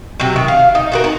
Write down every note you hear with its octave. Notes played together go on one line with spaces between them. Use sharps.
C3 F#3
D#3
F5
D#4
A3 F#4 A#4
D#4